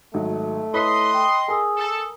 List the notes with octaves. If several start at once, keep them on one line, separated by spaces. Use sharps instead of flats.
G#1 F#3 A3
E4 B4 C#5 D#5 C6 B6
G5
G#4 A#4 G#5 D#6 E6
A4